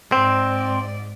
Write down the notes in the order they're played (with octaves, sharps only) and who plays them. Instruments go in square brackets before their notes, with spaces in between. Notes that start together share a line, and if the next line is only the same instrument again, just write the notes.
[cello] G#2 D5 [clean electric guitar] C4